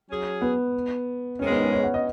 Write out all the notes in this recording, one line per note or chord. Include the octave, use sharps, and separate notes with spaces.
F#3 C#4 G#4
B3
G#2 D#3 G#3 C#4
B3
C#4
C#5
F#5
D#5